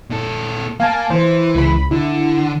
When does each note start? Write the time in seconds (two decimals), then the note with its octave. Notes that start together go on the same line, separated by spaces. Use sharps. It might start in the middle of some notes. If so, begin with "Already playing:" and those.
0.10 A#2 A4
0.80 A#3 F5 G#5 A5
1.10 E3 C5
1.55 C#2 B5
1.91 D3 E4